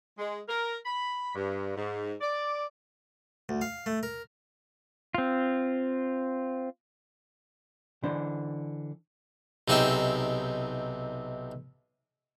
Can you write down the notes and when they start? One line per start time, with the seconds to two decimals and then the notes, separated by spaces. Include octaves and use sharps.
0.18 G#3
0.49 A#4
0.86 B5
1.35 G2
1.77 G#2
2.21 D5
3.49 D2
3.61 F5
3.86 A3
4.03 A#4
5.15 C4 F4
8.04 D3 E3 D4 C5
9.68 B1 C3 D#4 G#4 E5 G5